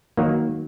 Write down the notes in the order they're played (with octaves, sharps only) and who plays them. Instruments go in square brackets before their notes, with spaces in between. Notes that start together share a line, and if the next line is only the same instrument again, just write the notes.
[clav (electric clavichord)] D#3 F#3 A#3